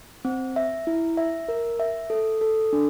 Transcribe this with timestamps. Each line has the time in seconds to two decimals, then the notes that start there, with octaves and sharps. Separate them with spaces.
0.25 C4
0.56 E5
0.87 E4
1.17 E5
1.49 A#4
1.80 E5
2.10 A4
2.41 A4
2.73 D4